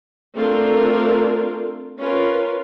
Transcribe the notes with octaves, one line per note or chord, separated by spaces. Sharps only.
A3 C4 D4 F4 A4 A#4
C#4 F4 A#4 B4